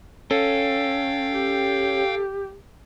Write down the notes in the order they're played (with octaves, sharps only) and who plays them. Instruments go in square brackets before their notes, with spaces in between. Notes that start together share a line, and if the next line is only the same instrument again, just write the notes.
[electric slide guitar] C#4 [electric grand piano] A4 [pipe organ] F5 G5
[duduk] G4